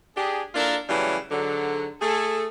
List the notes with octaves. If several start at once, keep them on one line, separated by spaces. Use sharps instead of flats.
D4 G4 G#4
A#3 D4 E4 F4 A4 A#4
C#3 E3 F#3 G3 A3
G#2 D3 F#3
A3 G#4 A4